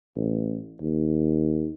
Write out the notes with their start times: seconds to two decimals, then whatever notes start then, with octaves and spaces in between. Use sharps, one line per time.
0.16 A1
0.81 D#2